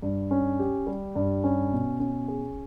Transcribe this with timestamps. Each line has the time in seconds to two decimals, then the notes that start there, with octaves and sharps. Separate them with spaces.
0.02 G2
0.31 C#4
0.59 G4
0.87 G3
1.15 G2
1.44 C#4
1.73 B2
2.00 C#4
2.28 G#4